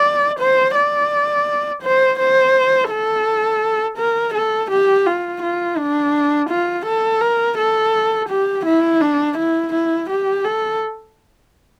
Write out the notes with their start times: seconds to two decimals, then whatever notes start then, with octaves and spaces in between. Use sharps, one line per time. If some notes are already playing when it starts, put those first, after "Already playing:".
Already playing: D5
0.40 C5
0.75 D5
1.82 C5
2.19 C5
2.90 A4
3.98 A#4
4.34 A4
4.71 G4
5.06 F4
5.42 F4
5.77 D4
6.50 F4
6.86 A4
7.21 A#4
7.58 A4
8.29 G4
8.65 E4
9.01 D4
9.38 E4
9.73 E4
10.09 G4
10.44 A4